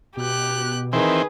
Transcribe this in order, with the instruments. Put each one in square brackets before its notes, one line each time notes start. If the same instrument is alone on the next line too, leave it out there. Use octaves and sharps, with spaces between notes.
[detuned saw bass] B2 [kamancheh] G4 F#6
[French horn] D#3 [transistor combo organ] E3 C4 [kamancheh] G#4 B4